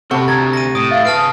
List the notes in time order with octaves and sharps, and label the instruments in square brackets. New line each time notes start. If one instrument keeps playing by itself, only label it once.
[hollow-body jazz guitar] C3 [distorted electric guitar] A4 B5 [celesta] F#5 A5 [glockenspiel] C#6
[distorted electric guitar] D2 [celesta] A#5 G#6 [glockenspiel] A6
[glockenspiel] A#6 D#7
[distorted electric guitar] A2 [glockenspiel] D#6
[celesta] E5 F5 A6
[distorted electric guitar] G#4 F5 [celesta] B4 [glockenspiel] A5 F6 D7